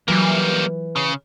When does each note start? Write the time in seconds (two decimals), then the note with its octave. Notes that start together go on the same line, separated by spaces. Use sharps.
0.08 E3 F#3 G3 A#3 F4
0.96 C#3